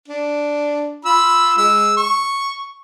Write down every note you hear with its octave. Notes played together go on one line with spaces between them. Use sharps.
D4
F4 B5 E6
G#3 E6
C#6